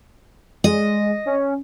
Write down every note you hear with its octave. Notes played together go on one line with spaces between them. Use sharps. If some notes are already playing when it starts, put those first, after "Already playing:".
G#3 D#5
C#4